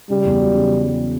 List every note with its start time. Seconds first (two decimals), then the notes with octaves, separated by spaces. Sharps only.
0.10 C#3 G3
0.25 E2
0.40 F#3
0.54 C#3